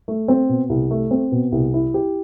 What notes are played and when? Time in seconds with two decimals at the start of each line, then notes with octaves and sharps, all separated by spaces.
0.08 A3
0.28 C4
0.49 B2
0.69 C2
0.91 A3
1.11 C4
1.32 B2
1.52 C2
1.74 E4
1.94 G4